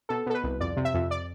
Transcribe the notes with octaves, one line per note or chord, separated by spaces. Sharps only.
B2 A4
B2 A4
B4
C2
F2 D5
C3
E5
F2
D5